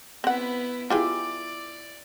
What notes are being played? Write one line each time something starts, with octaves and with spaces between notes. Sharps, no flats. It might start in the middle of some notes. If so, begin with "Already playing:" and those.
B3 C4 E4 F#5
E4 F4 G4 G#4 D5 D6